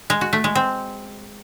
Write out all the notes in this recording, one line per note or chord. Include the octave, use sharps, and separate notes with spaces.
G#3
F#4
A3
G#3
C4